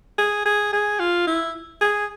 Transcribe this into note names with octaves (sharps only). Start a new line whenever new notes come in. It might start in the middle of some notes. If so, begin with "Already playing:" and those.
G#4
G#4
G#4
F4
E4
G#4